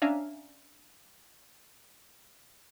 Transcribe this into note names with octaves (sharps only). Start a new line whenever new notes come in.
C#4 D4 E5 F5 G#5 A#5